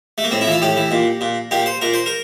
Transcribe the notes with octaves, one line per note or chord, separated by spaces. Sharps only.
A3
A#3
A2 C4
E4
E3 F4
A2 G4
E3
A#2
A#2
A#2 G4
C5
A#2 A#4
C5
A#4